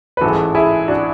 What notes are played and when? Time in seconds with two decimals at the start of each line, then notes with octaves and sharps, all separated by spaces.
0.17 B4
0.21 A1 G#2 G#3 F#4 A4
0.55 E4 G#4
0.88 D4 F#4